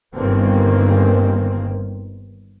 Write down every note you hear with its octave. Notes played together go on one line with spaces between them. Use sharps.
G1 G2 D#3 A#3 C4